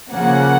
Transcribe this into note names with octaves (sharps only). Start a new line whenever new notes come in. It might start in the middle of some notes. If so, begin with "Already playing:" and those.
C#3 F3 A#3 C#4 F#5